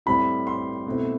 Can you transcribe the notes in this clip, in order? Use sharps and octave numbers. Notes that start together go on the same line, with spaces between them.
A2 G3 C4 E4 B5
C6
B2 A3 C4 E4